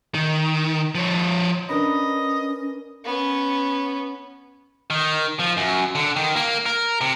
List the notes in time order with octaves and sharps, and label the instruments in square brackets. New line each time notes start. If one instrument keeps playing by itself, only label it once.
[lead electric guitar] D#3
F3 C#5
[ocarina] C#4 [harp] D4 A#4 B4 [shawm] D#5
[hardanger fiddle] B3 C#4
[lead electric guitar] D#3
F3
F#2
D3
D#3
A#3
A#4
C3